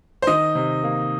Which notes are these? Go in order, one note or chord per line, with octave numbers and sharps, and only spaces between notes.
C5
D#3 D#5
C3
A#3